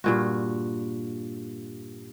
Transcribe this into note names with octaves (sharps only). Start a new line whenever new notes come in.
G2 A#2 F#4